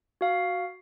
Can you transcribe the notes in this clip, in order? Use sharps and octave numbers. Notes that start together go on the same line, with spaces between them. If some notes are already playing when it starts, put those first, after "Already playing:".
F#4 F5